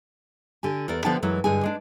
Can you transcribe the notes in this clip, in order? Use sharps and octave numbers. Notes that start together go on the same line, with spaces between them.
D3 G4 G#5
E2 A#4 D5
D3 F3 B3 D5 G5 A5
F#2 E3 F#3 G#3
G2 D3 G#3 G#4 G#5
G#3 D4